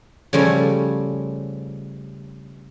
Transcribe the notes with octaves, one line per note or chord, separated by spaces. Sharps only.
C#3 F3 G3 A3 C#4